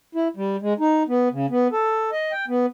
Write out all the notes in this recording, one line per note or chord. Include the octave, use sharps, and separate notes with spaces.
E4
G3
G#3
D#4
B3
C#3
B3
A4
D#5
G5
B3